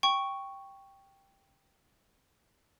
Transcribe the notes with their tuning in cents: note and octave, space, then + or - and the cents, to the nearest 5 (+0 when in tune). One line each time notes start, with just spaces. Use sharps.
G5 +0 C#6 +0